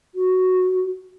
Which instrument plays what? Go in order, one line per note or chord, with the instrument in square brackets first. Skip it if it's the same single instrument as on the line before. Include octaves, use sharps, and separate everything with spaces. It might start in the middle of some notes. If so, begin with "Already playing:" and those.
[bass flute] F#4